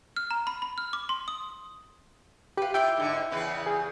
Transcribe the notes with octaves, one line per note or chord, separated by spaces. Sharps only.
F6
A#5
B5
B5
F6
D6
C6
D#6
F4 G4 B4
E4 F4 G5 D6 G6
G#2 D3
E2 C#3 B4
G#4